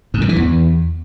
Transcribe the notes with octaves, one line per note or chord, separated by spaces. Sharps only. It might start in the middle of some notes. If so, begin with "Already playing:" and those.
G#2
C#3
E3
E2